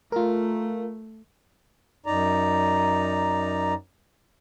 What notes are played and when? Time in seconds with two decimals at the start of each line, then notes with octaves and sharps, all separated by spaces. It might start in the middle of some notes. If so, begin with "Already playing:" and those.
0.12 A3 F4 A#4
2.06 F#2 D#4 D5 A#5